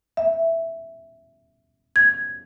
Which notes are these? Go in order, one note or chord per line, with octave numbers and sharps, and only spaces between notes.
E5
G#6